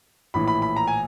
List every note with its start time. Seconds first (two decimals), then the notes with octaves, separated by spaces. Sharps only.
0.34 A#1 A2 E3 B5
0.47 B5
0.62 B5
0.76 A#5
0.87 G#5